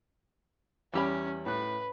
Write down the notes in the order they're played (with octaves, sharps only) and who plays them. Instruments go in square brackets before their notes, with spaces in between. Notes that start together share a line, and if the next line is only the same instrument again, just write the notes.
[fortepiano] E2 [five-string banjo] G3 G4 B5 [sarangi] C#4
[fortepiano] A2 F#6 [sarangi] B4